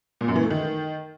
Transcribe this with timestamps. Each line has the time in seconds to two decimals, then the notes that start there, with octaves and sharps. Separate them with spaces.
0.21 A#2
0.28 F#2
0.36 E3
0.43 A3
0.50 D#3